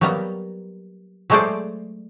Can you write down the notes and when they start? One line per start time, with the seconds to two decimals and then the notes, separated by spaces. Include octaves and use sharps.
0.01 F#3 G3 A#3 B3 A#5
1.30 F#3 G#3 A3 G#4 C5 D5